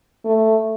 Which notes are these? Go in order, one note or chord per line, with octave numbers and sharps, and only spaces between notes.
A3